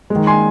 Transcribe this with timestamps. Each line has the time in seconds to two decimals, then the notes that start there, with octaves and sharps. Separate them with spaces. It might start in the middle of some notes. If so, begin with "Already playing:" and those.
0.10 G#3
0.16 D#3
0.27 G#5 C6